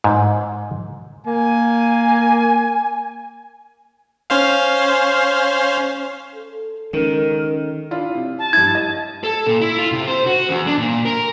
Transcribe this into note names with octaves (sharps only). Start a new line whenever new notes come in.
G#2
A#3 G#5
C#4 C5 F5
A4
C#2 D#3 A#4
D4 E4 F4
C3
A5
G2 E4 G#6
D#5
A4
A#2
E4
F4
C3
C5
F#4
E2
D4
A#2
A#4